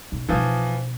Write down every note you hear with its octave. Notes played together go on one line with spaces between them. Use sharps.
B1
B1 E3 F3 G#3